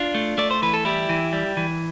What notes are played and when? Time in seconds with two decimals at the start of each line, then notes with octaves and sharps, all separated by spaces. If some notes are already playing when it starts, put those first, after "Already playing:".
Already playing: D4 F4
0.14 A3
0.38 A3 D5
0.51 C5
0.62 E3 B4
0.74 A4
0.85 G3 E4 G4
1.09 E3
1.33 G3
1.57 E3